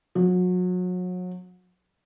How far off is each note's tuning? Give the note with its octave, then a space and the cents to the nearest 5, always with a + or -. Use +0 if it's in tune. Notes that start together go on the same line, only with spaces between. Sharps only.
F#3 -30